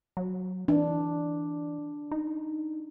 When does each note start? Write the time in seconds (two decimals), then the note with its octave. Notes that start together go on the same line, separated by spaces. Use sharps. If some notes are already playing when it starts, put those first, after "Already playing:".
0.17 F#3
0.68 E3 D4
2.11 D#4